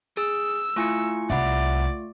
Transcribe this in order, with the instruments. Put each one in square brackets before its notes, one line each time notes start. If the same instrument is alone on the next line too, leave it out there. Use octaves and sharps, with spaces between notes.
[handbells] G#4 [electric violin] E6
[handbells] A3 F4 C#6 [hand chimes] E4 G#5 C#7
[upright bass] C2 [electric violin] D5 [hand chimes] E5 F#5 B5